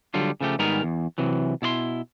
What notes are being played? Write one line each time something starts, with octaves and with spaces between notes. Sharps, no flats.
D3 F#3 G3 F4
C#3 F3 A3 G4
G#2 D#3 G3 B3 G#4 A#4
E2
C3 E3 F#3
B2 E4 D5 C6